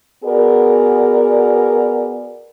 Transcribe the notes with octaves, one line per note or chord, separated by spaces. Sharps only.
B3 F#4 G#4 A#4 D5